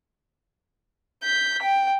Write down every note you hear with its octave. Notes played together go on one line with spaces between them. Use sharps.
G6 B6
G5